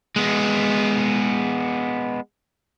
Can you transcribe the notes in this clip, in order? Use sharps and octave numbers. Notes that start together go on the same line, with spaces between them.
G#3 B3